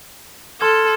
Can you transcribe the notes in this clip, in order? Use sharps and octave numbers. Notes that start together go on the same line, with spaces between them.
A4 C6 F6 G#6